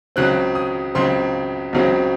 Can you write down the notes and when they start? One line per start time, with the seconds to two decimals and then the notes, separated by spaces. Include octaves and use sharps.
0.16 C#2 C#3 F#3 C4 F#6
0.55 D#6
0.95 C#2 C#3 F#3 C4 C6
1.73 C#2 C#3 F#3 C4